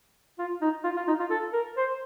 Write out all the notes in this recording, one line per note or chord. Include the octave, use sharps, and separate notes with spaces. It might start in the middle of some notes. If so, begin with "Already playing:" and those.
F4
D#4
F4
F4
D#4
F4
A4
A#4
C5